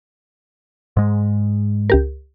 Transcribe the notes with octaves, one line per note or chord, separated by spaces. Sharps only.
G#2 G#3
C#2 G4 A#4